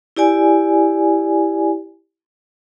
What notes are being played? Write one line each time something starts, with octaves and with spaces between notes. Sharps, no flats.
E4 G4 D5 G#5